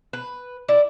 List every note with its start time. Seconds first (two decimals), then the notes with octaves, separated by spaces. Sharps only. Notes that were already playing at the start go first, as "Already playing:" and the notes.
0.13 B4
0.69 E4 D5